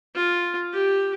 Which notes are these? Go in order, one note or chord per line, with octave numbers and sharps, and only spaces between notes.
F4
G4